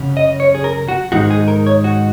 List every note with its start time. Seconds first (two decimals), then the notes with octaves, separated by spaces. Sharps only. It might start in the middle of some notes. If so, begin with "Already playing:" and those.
Already playing: F#2 C#3 F#3 C#4
0.17 D#5
0.40 C#5
0.55 G#4
0.64 A#4
0.88 F#4
1.12 G#2 D#3 G#3 D#4 F#4
1.30 G#4
1.48 A#4
1.67 C#5
1.84 F#4